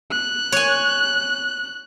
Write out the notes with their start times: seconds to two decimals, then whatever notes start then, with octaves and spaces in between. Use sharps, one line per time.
0.11 F#6
0.52 C#5 G#5